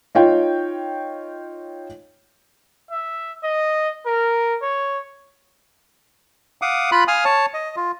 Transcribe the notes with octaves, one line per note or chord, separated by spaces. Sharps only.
D#4 F4 C#5 G5
E5
D#5
A#4
C#5
F5 F#5 D6 D#6
F4 B5 F#6
F5 G#5 D#6 F6
C#5 A5
D#5
F4